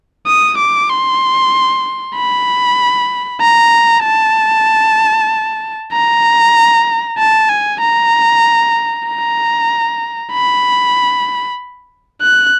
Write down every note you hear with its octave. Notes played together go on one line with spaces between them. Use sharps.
D#6
D6
C6
B5
A#5
A5
A#5
A5
G#5
A#5
A#5
B5
F#6